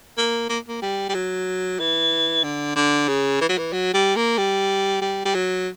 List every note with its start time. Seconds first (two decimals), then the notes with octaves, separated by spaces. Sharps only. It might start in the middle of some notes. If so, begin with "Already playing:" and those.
0.17 A#3
0.49 A#3
0.68 A#3
0.82 G3
1.09 G3
1.14 F#3
1.79 E3
2.44 D3
2.76 D3
3.08 C#3
3.41 E3
3.49 F#3
3.58 E3
3.73 F#3
3.94 G3
4.16 A#3
4.38 G3
5.01 G3
5.25 G3
5.35 F#3